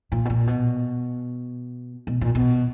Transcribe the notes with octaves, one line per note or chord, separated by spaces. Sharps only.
A#2
B2
A#2
B2
B2
A#2
B2